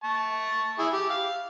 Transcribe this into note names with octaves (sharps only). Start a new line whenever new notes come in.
A5 C#6
E4 G#4
G4
F5